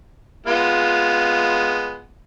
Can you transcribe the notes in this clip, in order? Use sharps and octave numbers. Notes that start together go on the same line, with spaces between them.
G#3 B3 F4